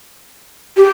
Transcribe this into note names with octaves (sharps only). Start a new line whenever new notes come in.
G4